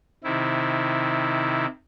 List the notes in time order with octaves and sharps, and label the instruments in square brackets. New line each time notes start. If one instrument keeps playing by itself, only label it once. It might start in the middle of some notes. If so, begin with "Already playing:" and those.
[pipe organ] C3 D#3 E4